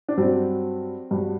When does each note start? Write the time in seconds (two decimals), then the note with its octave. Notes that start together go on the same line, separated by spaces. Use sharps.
0.08 D4
0.17 G2 F#3 C4
1.11 G2 F#3